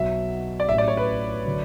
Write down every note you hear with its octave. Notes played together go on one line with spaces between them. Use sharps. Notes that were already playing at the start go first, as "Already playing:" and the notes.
Already playing: B1 B2 F#3 E5
D5
A1 A2 F#3 C#4 G4 E5
D5
C#5
B4
D3 F#3